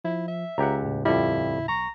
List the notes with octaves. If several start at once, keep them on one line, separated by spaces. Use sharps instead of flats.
F3 E4
E5
C#2 G4 F#5 A#5
D#2 A2 C#3
F2 G3 E4
B1 A#5 C#6